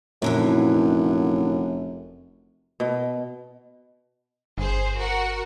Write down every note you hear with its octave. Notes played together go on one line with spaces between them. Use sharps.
F1 F#2 A#2 D3 E3
B2
G1 G#4 C5
F#4 A#4 F#5